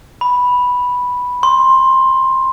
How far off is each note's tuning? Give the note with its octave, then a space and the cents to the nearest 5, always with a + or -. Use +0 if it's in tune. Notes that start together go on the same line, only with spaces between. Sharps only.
B5 -5
C6 +15